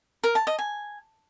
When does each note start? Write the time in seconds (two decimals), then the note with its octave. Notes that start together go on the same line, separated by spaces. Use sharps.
0.24 A#4
0.35 A5
0.47 D#5
0.59 G#5